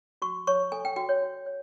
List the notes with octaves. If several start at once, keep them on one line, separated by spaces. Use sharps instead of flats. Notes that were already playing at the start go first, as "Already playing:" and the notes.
F#4 C#6
C#5 C#6
A4 G#5
G5
F#4 G5
C#5
F#4
C#5